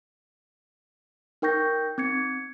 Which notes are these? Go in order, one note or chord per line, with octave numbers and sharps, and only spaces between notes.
D#4 A#4 G5 C#6 G6 A#6
C4 G#6 C#7